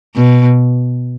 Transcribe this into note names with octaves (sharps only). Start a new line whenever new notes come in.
B2